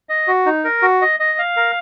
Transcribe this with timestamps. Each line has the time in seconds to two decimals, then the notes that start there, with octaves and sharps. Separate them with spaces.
0.09 D#5
0.28 F#4
0.46 D#4
0.65 A#4
0.82 F#4
1.02 D#5
1.20 D#5
1.39 F5
1.57 A#4